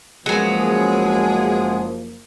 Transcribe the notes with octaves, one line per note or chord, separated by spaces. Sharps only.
F#1 F3 F#3 G#3 A#3 B3 G#4